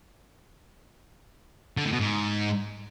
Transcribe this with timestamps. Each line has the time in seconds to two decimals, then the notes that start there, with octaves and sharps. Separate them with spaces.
1.77 D3
1.85 A2
1.92 B2
2.00 G#2